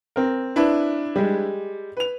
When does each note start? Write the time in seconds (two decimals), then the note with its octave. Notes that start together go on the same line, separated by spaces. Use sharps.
0.16 C4 A#4
0.56 D4 E4 B4
1.16 G3 G#3
1.97 B4 F7